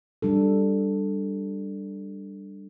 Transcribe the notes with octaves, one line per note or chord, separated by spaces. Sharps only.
G3 D4 A4